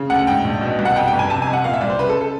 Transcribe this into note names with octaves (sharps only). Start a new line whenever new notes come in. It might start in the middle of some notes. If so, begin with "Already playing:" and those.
Already playing: C#3
D2 F#5
G#2 G5
A#1
B2
C2
F#5
F2 G5
G5
G1
G#5
C3 A5
G#5
F2
F#5
A#2 F5
E5
C2 D5
C5
C#3 B4
A4
A4